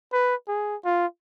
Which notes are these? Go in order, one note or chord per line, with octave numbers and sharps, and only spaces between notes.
B4
G#4
F4